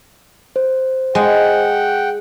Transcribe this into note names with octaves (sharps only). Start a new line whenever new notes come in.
C5
G#3 F#5 G5